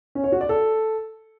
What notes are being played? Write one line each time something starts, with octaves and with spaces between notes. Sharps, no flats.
C#4
C#5
F#4
D5
A4